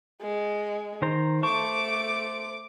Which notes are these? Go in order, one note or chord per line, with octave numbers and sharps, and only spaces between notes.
G#3
D#3 C5 A#5
A3 C5 A5 C#6 D6